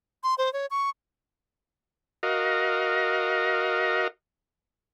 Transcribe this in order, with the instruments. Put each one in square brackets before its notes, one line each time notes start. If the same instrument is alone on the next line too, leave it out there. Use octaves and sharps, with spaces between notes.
[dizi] C6
C5
C#5
C#6
[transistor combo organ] F#4 A#4 D#5 F5